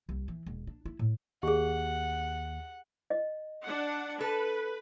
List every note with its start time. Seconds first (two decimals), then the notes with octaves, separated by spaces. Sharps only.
0.09 C2
0.28 E3
0.46 E1
0.67 D4
0.85 E4
0.99 A2
1.43 D#2 G4 G#4 F#5
3.10 D#5
3.66 D4 F#5
4.20 A4 B4